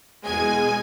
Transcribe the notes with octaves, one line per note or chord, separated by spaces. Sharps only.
E2 B2 G#3 G#5